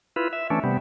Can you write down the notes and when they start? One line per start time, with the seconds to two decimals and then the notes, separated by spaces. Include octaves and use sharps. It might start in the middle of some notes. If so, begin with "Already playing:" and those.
0.16 E4 F4 B4
0.33 E5
0.50 E3 A3 C#4 D4
0.64 C3 G3 B3